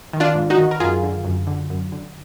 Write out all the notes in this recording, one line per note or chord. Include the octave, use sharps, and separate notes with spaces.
D#3
D4 F4
G#2
D#4 F#4
D#3
A#4
F#2 F4 G#4
D3
F#2
D3
F#2
D3